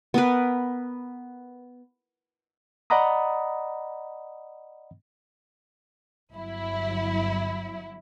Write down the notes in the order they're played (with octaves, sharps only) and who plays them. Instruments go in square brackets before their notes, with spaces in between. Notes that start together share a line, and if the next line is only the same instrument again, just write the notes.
[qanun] B3 A#4 B4
[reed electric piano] D5 D#5 F#5 A#5 B5 D#6
[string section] G1 F#3 E4